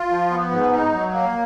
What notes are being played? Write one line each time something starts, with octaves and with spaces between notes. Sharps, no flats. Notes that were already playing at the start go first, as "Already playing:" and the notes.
Already playing: F4
F3
B3
G#2
D#4
F#3
A#3